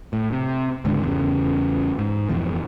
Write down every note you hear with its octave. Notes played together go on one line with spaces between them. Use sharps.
A2
C3
C#2 G#2 D3
E2 C#3
G#2
F2 B2 E3